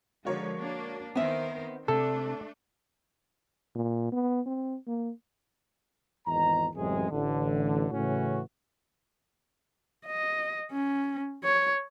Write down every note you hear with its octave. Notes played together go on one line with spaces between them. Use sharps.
D3 F3 G#3 F#4 A#4 C#5
A#3 D4
D#3 B3 C4 A#4 C5 E5
C3 A3 D4 A4
A#2
B3
C4
A#3
G#1 E2 D#5 A#5
A1 F#2 C3 G#3 G#4
A1 D3
A2 C#3 E3 C#4 F#4
D#5
C#4
C#5